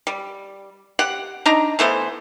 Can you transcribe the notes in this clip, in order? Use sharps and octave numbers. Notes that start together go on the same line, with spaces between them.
G3
G4 F#5
D4 D#4 A#5
E3 A3 B3 C5